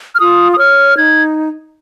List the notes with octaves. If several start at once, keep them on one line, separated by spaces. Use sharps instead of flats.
F6
F4 D#6
D#6
C#5 F6
D#4 G#6